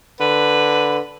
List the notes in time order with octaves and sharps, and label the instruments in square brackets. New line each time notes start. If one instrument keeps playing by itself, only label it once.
[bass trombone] D3 [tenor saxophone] B4